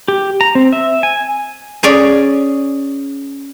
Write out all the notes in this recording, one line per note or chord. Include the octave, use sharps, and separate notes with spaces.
G4
A#5
C4
E5
G#5
C#4 G#4 C#5 D5